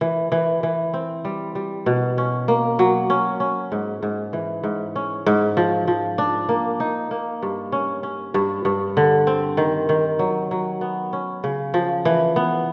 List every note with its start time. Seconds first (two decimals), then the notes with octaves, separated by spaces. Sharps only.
0.01 E3
0.32 E3
0.63 E3
0.94 C4
1.25 G3
1.55 G3
1.86 B2
2.18 C#4
2.48 A#3
2.79 F#3
3.10 C#4
3.40 C#4
3.72 G#2
4.03 G#2
4.33 E3
4.64 G#2
4.96 C#4
5.26 G#2
5.57 F3
5.88 F3
6.18 D4
6.49 A#3
6.80 D#4
7.11 A#3
7.42 G2
7.72 C#4
8.03 C#4
8.34 G2
8.65 G2
8.97 D3
9.27 C4
9.57 D#3
9.89 D#3
10.19 F#3
10.51 F#3
10.81 B3
11.13 C#4
11.44 C#3
11.74 F3
12.05 E3
12.36 B3